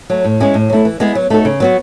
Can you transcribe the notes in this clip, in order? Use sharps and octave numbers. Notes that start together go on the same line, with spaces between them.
F#3 A3
A2
G#3 C#4 E4 G#4
A2
F#3 A3 E4
E3
G#3 B3 E4 G#4
F#3
A3 D#4 F#4 A4
C#3
F#3 B3 F#4